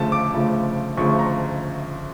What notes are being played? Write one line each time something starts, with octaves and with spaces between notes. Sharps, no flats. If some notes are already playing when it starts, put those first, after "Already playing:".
Already playing: D2 C#3 F3 A3 A5
D6
D2 C#3 F3 A3
D2 C#3 F3 A3 C#6
A#5